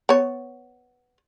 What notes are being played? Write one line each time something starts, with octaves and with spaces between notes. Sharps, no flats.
B3 C#5